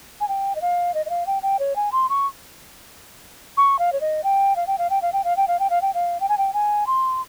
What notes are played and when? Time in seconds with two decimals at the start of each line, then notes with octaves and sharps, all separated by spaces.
0.20 G#5
0.28 G5
0.55 D#5
0.61 F5
0.94 D#5
1.06 D#5
1.10 F5
1.26 G5
1.42 G5
1.59 C#5
1.76 G#5
1.92 C6
2.09 C#6
3.57 C#6
3.79 F5
3.93 C#5
4.01 D#5
4.24 G5
4.56 F5
4.67 G5
4.78 F5
4.90 G5
5.02 F5
5.13 G5
5.24 F5
5.37 G5
5.48 F5
5.59 G5
5.70 F5
5.82 G5
5.94 F5
6.20 G5
6.29 G#5
6.38 G5
6.53 G#5
6.87 C6